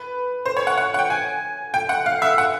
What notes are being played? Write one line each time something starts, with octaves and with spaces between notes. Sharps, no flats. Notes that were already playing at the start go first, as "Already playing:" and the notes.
Already playing: B4
C5
C#5
F#5
F#5
F#5
G5
G#5
G5
F#5
F5
E5
F#5